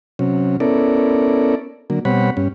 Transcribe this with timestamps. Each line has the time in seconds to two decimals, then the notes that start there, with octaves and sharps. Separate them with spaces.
0.19 C3 F#3 C#4
0.60 B3 C#4 E4 A4 A#4 D5
1.90 D3 F#3 A#3
2.05 B2 G3 C4 C#5 F#5 B5
2.37 G2 C#4